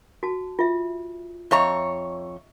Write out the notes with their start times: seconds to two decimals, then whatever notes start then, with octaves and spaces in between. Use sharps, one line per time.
0.23 F#4 A5
0.59 F4 E5
1.51 F2 C#5 D#5 E5 A#5 C#6